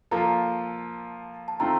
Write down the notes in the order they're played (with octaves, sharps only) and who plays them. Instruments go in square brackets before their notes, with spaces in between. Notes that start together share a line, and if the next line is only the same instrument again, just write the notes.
[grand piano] F3 A#3 F4 A4 [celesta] A#5
[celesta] A5
[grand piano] D#3 A3 C4 F4 [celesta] A#5